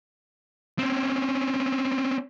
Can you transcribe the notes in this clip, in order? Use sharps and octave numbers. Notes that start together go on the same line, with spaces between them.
C4 C#4